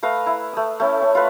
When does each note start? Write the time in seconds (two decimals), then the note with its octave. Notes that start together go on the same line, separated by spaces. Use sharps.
0.03 A3 B4 F5 A#5
0.26 E4
0.53 A3 D#6
0.80 A3 C#4 E4
1.02 C#4 C#6
1.15 F4 B4 A#5